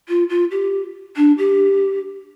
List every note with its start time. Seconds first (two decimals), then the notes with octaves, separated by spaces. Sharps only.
0.08 F4
0.29 F4
0.51 G4
1.16 D4
1.38 G4